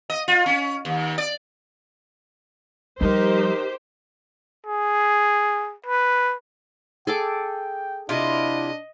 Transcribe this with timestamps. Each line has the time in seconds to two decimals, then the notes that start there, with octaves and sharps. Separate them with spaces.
0.10 D#5
0.28 F4
0.46 C#4
0.85 D#2
1.18 D5
3.01 F3 G3 D#4 G4 A#4 C5
4.66 G#4
5.86 B4
7.07 G#4 A4 G5 D6
8.09 C3 D4 E4 F4 D#5